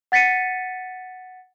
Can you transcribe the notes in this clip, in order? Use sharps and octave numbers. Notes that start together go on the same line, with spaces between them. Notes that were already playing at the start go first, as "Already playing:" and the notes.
F#5 A6 B6 C#7 D#7